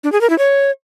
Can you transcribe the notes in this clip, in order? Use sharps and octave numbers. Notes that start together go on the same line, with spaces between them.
D4
G#4
A#4
E4
C#5